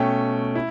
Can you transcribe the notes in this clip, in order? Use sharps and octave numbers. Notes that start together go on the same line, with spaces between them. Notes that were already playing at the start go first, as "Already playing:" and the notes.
Already playing: B2 A3 C#4 G5
E4